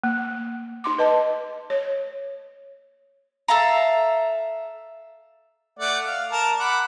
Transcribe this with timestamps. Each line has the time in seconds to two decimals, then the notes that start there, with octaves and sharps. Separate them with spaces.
0.04 A#3
0.84 D#4 C6 D6
0.99 B4 D#5 A5
1.70 C#5
3.48 A4 E5 F5 A#5
5.79 A3 D5 F#5
6.07 F5
6.32 A#4 A5
6.59 F#5 B5 D6